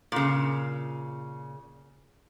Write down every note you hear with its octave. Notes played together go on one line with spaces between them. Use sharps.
A#2 C#3